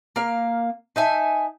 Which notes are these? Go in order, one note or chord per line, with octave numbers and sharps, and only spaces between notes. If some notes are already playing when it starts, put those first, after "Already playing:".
A#3 F5
D#4 E5 G#5 A5